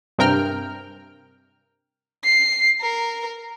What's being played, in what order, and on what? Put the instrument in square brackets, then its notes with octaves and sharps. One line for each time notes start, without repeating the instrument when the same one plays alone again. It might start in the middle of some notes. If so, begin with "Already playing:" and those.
[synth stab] G2 C3 A#4 G5 F6
[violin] C7
A#4